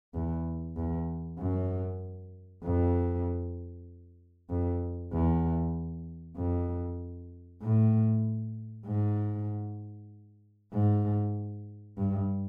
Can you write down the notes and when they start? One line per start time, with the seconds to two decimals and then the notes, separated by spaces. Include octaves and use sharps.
0.14 E2
0.77 E2
1.39 F#2
2.64 F2
4.50 F2
5.12 E2
6.37 F2
7.62 A2
8.86 G#2
10.73 G#2
11.98 G2